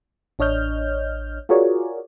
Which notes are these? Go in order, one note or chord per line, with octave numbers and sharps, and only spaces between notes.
A1 D4 C#5 D#5 F6 G6
F4 F#4 G#4 A#4 C#5 D5